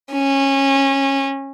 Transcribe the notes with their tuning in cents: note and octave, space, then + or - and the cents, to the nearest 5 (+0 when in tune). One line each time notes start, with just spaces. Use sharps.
C#4 -20